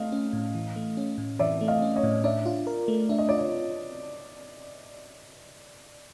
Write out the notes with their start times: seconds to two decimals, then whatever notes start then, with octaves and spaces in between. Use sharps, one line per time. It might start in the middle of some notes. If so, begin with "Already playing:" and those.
Already playing: A3 D#5 F5
0.12 C#4
0.33 A2
0.55 E3
0.76 A3
0.97 C#4
1.18 A2
1.39 E3 D5 E5
1.61 A3
1.68 D#5 F5
1.82 C#4
1.96 C#5 D#5
2.03 A2
2.24 D4 D5 E5
2.46 F4
2.67 A#4
2.88 A3
3.09 D4 E5
3.18 D#5
3.29 F4 D5
3.38 C#5 D#5